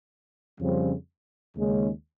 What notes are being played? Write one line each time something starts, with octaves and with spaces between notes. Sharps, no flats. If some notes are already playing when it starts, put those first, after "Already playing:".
F2 C#3 G3 C4
D#2 C#3 G#3 C#4